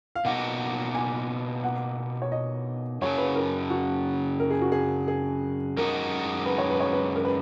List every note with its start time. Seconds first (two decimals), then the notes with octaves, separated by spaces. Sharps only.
0.16 F5
0.25 B2 A#3 D#4 F#4 F#5
0.95 G#5
1.63 F#5
2.22 C#5
2.32 D#5
3.01 F#2 C#3 F#3 C#5
3.18 B4
3.35 A#4
3.70 F#4
4.40 A#4
4.50 G#4
4.62 F#4
4.72 G#4
5.08 G#4
5.77 F#2 D#3 G#3 D#4 F#4 A#4
6.46 B4
6.58 C#5
6.70 B4
6.80 C#5
6.93 B4
7.16 A#4
7.25 B4